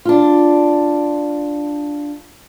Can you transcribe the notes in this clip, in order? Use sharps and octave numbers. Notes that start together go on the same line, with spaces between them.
D4 F4